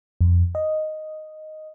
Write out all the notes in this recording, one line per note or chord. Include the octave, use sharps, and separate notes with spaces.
F2
D#5